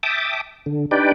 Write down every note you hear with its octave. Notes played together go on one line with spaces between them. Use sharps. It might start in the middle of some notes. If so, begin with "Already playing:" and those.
E5 G5 A5 D6 D#6
D3
D4 D#4 G4 B4 D5 G5